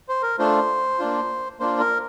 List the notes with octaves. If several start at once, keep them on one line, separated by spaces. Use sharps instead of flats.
C5
A#4
A3 D4 F4 C5
A#3 D4 F4
A#3 D4 F4 C5
A#4